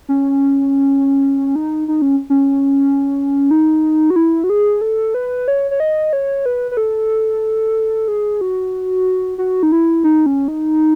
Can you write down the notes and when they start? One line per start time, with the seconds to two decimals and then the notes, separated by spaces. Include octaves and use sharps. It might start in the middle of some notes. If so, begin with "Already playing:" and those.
0.09 C#4
1.56 D#4
1.88 D#4
2.02 C#4
2.30 C#4
3.51 D#4
4.10 F#4
4.16 E4
4.44 F#4
4.50 G#4
4.81 A4
5.14 B4
5.48 C#5
5.71 C#5
5.80 D#5
6.13 C#5
6.46 B4
6.71 B4
6.77 A4
8.08 G#4
8.41 F#4
9.38 F#4
9.63 D#4
9.72 E4
10.03 D#4
10.26 C#4
10.48 D#4